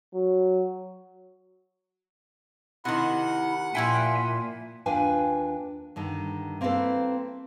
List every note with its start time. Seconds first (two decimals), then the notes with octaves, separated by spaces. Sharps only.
0.14 F#3
2.85 C3 D#3 E4 F#5
3.75 A#2 F3 E4 E5 G5 G#5
4.86 D#2 D4 F4 B4 G5 G#5
5.96 G2 D3 D#3
6.61 A#3 C4 E4 F#4 A4 B4